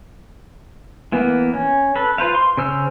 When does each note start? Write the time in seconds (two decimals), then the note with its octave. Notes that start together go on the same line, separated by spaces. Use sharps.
1.12 E3 A#3 B3
1.54 C#4
1.96 A4 B4
2.18 F4 B4 C5 F5
2.35 C6
2.57 C#3 C5 E6 F6